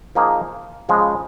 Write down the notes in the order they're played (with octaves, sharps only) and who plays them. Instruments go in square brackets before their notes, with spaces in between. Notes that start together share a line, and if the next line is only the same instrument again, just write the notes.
[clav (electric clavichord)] F3 A#3 D#4 G#4
C#3 F3 G#3